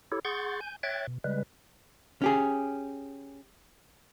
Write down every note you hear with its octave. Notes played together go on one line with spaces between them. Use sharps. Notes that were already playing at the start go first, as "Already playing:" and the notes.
E4 G4 A4 C#5
G#4 F#5 C6 C#6 G6 A6
G#5 G6
C#5 E5 G5 F#6 G#6 A6
B2
C#3 G3 G#3 B4
C#4 G4 G#4